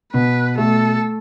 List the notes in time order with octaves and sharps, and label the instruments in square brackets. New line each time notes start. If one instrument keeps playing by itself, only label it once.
[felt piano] B2 [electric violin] B4
[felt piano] A3 [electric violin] A4